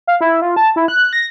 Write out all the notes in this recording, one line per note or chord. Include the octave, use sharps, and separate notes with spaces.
F5
E4
F4
A5
E4
F#6
A#6